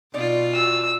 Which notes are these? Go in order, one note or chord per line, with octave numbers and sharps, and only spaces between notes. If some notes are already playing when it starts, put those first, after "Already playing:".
B2 C4 D#4 F4 D5
F#4 E6